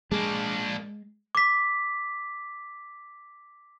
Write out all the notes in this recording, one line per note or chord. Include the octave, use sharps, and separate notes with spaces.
G#3 A#3 D4
D6 B6